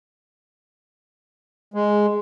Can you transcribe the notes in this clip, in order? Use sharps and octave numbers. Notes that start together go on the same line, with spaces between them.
G#3